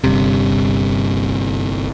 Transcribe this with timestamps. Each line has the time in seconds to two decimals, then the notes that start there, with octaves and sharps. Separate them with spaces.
0.04 G1 G2 C3